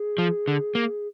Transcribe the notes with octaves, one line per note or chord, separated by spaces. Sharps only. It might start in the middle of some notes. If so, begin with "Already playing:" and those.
Already playing: G#4
F3
D3
A#3